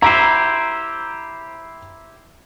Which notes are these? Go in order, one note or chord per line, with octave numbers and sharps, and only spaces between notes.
E4 G4 C5 A#5 E6